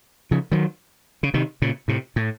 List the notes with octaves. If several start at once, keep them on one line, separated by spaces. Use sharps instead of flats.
C#3 F3
D#3 F#3
C#3
C3 D#3
A#2 C#3
A2 C3
A2